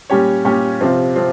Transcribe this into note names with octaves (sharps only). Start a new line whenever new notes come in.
A#2 G3 C#4 G4 C#5
A#2 G3 C#4 G4 C#5
C3 F3 C4 F4
F3 C4 F4